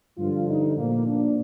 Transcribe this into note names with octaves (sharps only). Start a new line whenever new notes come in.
G2 D3 F3 F4
D#4
A#2 F3 A#3
D4